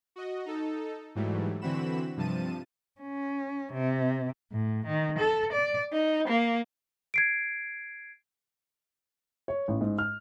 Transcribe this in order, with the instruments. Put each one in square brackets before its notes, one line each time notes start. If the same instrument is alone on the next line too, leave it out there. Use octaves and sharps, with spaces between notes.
[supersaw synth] F#4 D#5
D#4 A4
G#2 E3 F#3 G3 A3
D3 E3 C4 F#4 B5 E7
G2 C3 F3 A5 D#7
[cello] C#4
C3
[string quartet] A2
D#3
A4
D5
D#4
A#3
[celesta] G#6 C7 D7
[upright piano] C#5
A1
G#2
F6